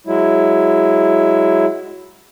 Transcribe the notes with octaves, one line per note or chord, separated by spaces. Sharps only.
F#3 G#3 E4